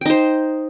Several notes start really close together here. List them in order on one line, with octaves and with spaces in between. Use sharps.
G5 D#4 C5